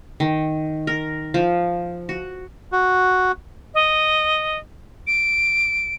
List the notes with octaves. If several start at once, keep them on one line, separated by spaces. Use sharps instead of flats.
D#3
A#4
F3
F#4
F#4
D#5
D7